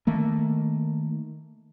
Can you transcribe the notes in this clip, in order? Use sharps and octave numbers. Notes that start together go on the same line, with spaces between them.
D#3 A3 A#3